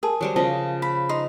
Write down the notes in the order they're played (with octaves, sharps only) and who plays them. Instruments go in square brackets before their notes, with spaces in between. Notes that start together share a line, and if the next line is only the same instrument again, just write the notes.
[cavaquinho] G#4 [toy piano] A#4 A5
[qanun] F#3 G3 C5
[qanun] C#3 F3 D#5 [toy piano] F5 A5
[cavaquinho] B5
[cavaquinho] D#4 C6 [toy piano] D#6